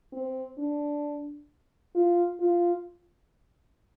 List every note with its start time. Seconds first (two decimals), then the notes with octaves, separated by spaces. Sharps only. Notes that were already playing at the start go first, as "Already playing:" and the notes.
0.13 C4
0.58 D4
1.95 F4
2.40 F4